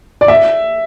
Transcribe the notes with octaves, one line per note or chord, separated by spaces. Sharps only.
D5
E5